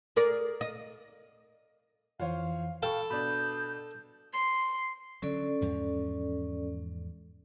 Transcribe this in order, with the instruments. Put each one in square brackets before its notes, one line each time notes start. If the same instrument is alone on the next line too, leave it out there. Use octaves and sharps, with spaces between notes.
[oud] G#4 A#4 D5
D#5
[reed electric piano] F2 E3 [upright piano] F4 C5 C#5 [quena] F5
[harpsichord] A4 [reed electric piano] F5 [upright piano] G5 C#6 [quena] B5
[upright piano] B2 D4 [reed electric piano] B5 [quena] G6
[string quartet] C6
[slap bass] D3 F#3 [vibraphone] C#4 A4 D5
[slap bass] E2 G#2 F3